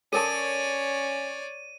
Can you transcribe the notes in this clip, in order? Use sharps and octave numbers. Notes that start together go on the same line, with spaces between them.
C#4 A4 A#4 C#5 D5 A5 D#7